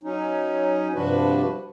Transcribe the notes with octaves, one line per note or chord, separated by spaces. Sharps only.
F#3 C#4 D#4
G2 C3 F3 D4 F#4 B4